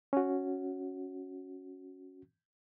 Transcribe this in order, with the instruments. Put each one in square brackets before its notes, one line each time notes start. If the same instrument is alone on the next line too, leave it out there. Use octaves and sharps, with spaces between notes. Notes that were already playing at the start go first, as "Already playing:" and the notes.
[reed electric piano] C#4 F#4